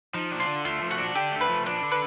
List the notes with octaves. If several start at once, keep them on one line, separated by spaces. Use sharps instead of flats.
F3 D#4
D4
F4
D3
A3 F4
F3
F#4
D4
D3 G4
A3
B4
F3
D4 B4
D3
B4